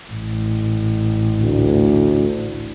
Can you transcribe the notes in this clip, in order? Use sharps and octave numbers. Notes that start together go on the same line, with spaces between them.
A1
D2